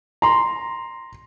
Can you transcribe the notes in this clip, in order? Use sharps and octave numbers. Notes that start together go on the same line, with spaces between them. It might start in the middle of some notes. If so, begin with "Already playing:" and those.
A#5 C6